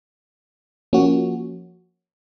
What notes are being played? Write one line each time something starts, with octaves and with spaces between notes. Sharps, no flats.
F3 A#3 C#4 F#4